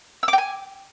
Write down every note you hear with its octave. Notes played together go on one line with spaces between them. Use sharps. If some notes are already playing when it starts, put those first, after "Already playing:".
E6
D6
G5
G#5